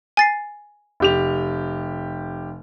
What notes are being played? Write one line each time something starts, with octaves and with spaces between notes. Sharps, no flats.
G#5 A6 C7
F1 G4 F7